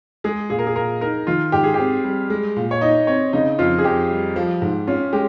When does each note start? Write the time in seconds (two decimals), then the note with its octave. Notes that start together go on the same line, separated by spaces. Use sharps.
0.24 G#3 G#4
0.50 A#2 G#4
0.59 A#4
0.67 G#4
0.76 A#2 A#4
1.01 D#4 A#4
1.27 D#3 F4
1.52 G#2 G4
1.63 G#4
1.74 G4
1.79 C4
2.04 G3
2.30 G#3
2.56 A#2
2.71 C#5
2.81 D#4 D#5
3.07 C4 C#5
3.33 C#3 D#4
3.59 F2 F4
3.79 G#4
3.84 F2 G4
4.11 G3
4.36 F3
4.62 G#2
4.87 C#4 F4
5.13 G#3 G4